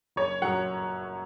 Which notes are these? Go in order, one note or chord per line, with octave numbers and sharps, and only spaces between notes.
F#1 C#5
F#2 F#3 F#5